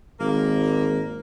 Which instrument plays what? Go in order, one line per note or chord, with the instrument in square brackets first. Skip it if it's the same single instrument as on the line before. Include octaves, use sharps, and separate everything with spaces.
[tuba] G#1 [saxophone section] A#3